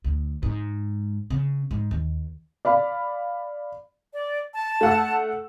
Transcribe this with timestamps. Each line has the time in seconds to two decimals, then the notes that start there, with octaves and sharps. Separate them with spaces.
0.04 D2
0.43 G#2
1.30 C#3
1.71 G#2
1.91 D#2
2.65 D5 F5 B5
4.13 D5
4.54 A5
4.81 A3 F#5 E6